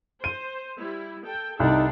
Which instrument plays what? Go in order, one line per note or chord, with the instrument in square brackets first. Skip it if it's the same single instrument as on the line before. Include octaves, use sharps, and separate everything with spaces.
[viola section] C5 [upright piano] D#7
[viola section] G3 E4
A4 G5
[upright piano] C2 [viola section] D4 A4 [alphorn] D#4